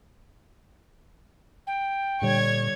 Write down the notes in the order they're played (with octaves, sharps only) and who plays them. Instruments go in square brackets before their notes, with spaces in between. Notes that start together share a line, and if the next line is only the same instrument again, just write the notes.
[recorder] G5
[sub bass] A#2 [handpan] D3 G3 [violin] C#5 G#6